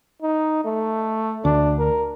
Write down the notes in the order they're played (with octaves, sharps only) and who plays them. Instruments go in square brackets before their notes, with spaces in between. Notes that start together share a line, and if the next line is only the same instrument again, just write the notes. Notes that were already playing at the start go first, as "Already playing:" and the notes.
[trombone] D#4
A3
[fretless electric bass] D2 [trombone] D4
[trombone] A#4